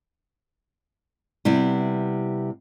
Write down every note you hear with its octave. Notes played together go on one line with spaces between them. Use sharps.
C3 G3 B3 E4